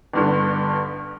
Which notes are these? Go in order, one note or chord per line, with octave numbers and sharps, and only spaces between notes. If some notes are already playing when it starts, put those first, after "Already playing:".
G1 G2 D3